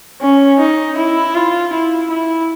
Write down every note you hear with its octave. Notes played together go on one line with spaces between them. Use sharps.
C#4
D#4
E4
F4
E4
E4